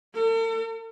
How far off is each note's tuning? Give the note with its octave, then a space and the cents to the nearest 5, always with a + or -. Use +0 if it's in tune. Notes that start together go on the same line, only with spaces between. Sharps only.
A4 +45